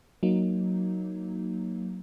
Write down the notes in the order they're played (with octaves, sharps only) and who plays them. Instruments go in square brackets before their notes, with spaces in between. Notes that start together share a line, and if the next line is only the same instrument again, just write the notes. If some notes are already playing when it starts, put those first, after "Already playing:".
[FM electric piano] F#3 A#3 D#4